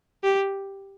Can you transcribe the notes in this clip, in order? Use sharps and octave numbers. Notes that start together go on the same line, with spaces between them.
G4